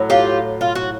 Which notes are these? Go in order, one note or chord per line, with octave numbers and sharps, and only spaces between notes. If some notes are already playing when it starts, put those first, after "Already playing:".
Already playing: A2 F#3
F4 G4
F4
F#4